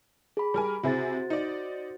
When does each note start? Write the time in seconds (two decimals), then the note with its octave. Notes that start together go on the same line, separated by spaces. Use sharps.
0.37 G#4 B5
0.54 G3 A#4 G#5
0.83 C3 E4 F#4 G#4 C5 A6
1.30 D#4 D5